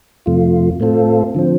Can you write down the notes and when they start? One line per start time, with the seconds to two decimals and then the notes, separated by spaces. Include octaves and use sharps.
0.26 F2 C3 F3 A3 F4
0.80 A2 A3 C4 F4 A4
1.35 D3 F3 C4